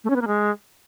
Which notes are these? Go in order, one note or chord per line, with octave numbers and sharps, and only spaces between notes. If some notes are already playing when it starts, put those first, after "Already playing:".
A3
C#4
B3
A#3
G#3